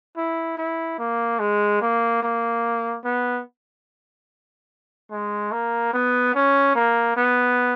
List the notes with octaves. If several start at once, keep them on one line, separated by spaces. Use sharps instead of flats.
E4
E4
A#3
G#3
A#3
A#3
B3
G#3
A#3
B3
C#4
A#3
B3